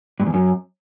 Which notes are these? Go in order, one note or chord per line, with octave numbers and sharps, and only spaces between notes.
G2
E2
F#2